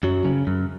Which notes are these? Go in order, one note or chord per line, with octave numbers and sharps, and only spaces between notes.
F#2 F#3
C#3
F#2